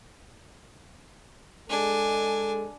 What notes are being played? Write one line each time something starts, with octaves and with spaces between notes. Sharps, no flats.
G#3 D4 A4 G#5